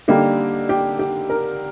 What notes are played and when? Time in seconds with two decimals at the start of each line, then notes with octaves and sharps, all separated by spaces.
0.08 D3 G3 A#3 D#4 G4
0.69 G4
0.99 G4
1.30 A#4